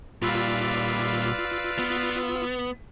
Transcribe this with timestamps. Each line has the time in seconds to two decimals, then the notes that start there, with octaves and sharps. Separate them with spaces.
0.22 A#2 G3 F4 B4 D5 F5 E6
1.79 B3